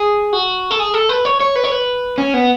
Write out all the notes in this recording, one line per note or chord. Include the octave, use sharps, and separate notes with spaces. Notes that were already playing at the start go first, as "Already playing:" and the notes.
Already playing: G#4
F#4
A4
G#4
A4
B4
C#5
C#5
B4
C#5
B4
C#4
B3